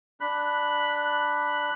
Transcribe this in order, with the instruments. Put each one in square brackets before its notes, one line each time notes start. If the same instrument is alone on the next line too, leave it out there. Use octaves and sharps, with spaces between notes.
[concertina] D4 B5 F#6